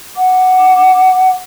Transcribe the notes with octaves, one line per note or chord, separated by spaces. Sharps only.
F#5 D6